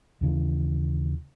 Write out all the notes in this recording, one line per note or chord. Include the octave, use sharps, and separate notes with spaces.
D#2 C#3 E3